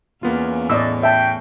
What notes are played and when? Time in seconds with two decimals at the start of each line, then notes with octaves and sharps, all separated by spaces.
0.23 E2 A#3 B3 C#4 F4
0.70 A2 D5 D#5 E6
1.03 E5 G5 A5